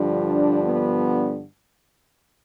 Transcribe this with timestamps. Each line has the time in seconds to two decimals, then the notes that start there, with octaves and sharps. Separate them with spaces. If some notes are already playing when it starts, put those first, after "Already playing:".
Already playing: G2 D3 F3
0.23 D4
0.63 B3